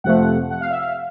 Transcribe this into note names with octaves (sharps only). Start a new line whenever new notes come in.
F2 C3 F3 A3 F#5
F#5
F5
E5
F5